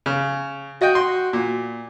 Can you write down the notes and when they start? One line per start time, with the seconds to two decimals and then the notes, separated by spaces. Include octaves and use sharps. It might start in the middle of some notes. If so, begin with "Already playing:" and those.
0.06 C#3
0.81 F#4 D#5 G5
0.95 C6
1.33 A#2